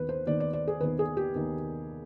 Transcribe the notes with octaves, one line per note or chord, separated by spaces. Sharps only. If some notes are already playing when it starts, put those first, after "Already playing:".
Already playing: D#2 D#3 B3 B4
C5
D#2 D#3 B3 D5
D5
D5
G#4
D#2 D#3 B3 B4
G#4
G4
D#2 D#3 B3